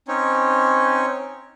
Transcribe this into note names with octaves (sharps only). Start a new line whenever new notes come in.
C4 C#4 D#4 C#5